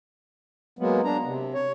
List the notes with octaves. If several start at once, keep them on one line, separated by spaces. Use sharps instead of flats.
F#3 G#3 A#3 B3
D4 A#5
C3
C#5